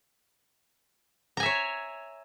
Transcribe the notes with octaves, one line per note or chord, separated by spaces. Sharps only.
C#5 E5 G#5 A#5